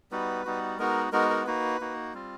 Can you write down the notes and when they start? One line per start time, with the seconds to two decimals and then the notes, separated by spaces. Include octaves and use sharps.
0.11 G3 B3 D#4 F#4 B4
0.45 G3 B3 D#4 F#4
0.79 G#3 B3 D#4 F#4 A#4
1.12 G#3 B3 D#4 F#4 A#4
1.30 A#4
1.46 A#3 D#4 F#4 B4
1.80 A#3 D#4 F#4
2.14 G3 C4 F4